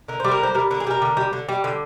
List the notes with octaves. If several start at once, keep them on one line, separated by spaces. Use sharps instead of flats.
D3 A#4
G3 C5
A#4
D3 C5
G3 A#4
D3 A#4
G#4
G3 A#4
D3
G3
D3
G3
D3